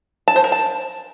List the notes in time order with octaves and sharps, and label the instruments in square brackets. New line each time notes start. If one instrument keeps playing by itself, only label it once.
[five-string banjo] A5
C5
A#4
A5